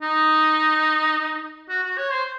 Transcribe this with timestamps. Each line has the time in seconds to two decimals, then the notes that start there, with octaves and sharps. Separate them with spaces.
0.02 D#4
1.69 F#4
1.84 F#4
1.97 C#5
2.11 C5